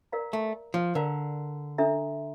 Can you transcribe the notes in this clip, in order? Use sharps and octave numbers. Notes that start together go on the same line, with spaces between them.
A#4 D5 F5 A#5
A3
F3
D3 A#4 D5 F5 A#5
D4 A4 E5 A#5